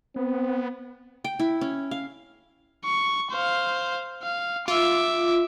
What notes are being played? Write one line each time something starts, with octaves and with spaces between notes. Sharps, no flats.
B3 C4
G5
E4
C#4
F5
C#6
C5 F5
F5
F4 E5 D6